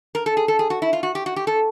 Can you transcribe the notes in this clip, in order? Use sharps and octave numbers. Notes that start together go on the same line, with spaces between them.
A#4
A4
G#4
A4
G#4
F#4
E4
F4
F#4
G4
F#4
G4
A4